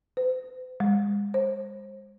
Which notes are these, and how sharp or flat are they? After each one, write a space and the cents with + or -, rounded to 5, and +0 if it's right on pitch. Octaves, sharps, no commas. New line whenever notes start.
C5 -45
G#3 -35
C5 +35